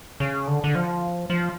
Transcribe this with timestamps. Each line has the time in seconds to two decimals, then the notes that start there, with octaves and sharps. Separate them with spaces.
0.20 C#3
0.47 D3
0.64 D3
0.75 F3
1.30 F3